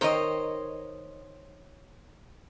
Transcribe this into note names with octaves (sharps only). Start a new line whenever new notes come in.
D#3 C5 C#5 D#5 G5 A#5